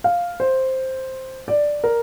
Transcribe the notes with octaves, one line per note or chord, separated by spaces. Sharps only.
F5
C5
D5
A#4